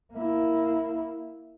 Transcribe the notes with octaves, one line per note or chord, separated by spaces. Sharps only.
A#3 E4